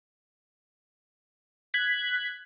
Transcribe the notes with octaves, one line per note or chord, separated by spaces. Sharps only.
F#6 G#6 B6